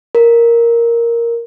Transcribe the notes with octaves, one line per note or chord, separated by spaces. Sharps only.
A#4